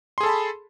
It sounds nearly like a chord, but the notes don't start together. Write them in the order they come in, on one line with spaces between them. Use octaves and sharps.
C6 G#4 A4 A5 B5